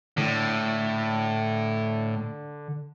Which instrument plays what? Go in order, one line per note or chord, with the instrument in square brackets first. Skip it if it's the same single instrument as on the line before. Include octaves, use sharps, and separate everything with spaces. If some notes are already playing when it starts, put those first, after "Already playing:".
[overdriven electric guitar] A2 [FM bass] D3